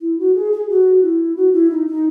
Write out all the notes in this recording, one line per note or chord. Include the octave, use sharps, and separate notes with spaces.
E4
F#4
G#4
G#4
F#4
E4
F#4
E4
D#4
D#4